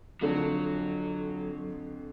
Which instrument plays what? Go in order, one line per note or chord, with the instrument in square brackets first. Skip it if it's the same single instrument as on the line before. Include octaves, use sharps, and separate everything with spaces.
[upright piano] F2 D3 F3 [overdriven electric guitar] F#3